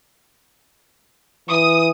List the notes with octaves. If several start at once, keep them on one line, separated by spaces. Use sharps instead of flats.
E3 D#6